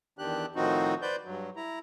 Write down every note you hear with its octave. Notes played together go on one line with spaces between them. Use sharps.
E2 D#3 D4 G4 F#6
A2 D#3 F3 C4 D#4 F#4
B4 C5 D5 G6
G2 F#3
E4 A#5